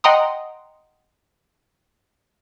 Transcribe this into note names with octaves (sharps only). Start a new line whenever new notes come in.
D#5 F#5 G5 A#5 C6 D#6